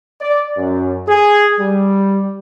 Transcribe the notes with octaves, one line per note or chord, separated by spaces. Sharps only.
D5
F#2
G#4
G3